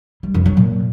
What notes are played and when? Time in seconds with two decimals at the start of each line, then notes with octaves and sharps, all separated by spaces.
0.23 G3
0.34 F2
0.46 F#3
0.57 A#2